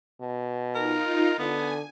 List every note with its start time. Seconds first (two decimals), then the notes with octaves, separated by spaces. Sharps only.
0.21 B2
0.75 D#4 F4 A#4
1.39 D3 B3 G#5